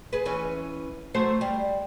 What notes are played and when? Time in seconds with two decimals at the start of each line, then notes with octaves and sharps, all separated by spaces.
0.13 G#4 B4
0.25 E3 C#4 B4
1.14 F#3 A3 C5
1.41 G3